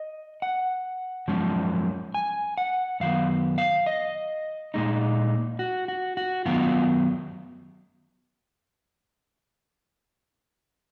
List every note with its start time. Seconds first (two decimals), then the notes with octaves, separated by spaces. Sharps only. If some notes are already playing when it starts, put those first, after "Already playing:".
Already playing: D#5
0.42 F#5
1.28 F#2 F3 G#3 C#4
2.14 G#5
2.58 F#5
3.00 F#2 D#3 F#3 B3 F5
3.58 F5
3.86 D#5
4.74 A#2 G#3 D#4
5.59 F#4
5.88 F#4
6.17 F#4
6.45 F#2 D#3 F#3 B3 F4